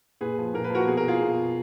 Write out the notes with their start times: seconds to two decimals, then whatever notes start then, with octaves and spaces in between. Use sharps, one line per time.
0.21 A#2 G#4 B4
0.38 F3
0.54 A#2 A#4
0.64 B4
0.70 F3 F#4 A#4
0.86 B2 G#4
0.97 A#4
1.08 F4 G#4
1.20 B2